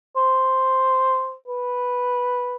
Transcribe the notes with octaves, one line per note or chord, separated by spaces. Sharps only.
C5
B4